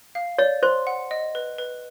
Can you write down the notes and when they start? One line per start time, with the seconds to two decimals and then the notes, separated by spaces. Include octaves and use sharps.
0.15 F5
0.38 C#5 D5
0.63 C5 C6
0.87 F#5
1.11 D#5
1.35 B4
1.58 B4